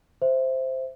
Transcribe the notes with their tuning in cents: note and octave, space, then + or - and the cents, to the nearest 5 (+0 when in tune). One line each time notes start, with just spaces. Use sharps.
C5 +0 E5 +0